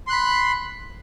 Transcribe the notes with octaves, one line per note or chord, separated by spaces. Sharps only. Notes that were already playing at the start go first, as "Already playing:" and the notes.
B5 C6 F#6